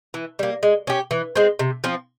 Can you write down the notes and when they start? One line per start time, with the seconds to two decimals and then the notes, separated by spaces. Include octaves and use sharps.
0.14 E3
0.39 G3 A#3
0.63 G#3
0.87 C#4 G4
1.11 E3
1.36 G#3 C4
1.59 C3
1.84 F3 C4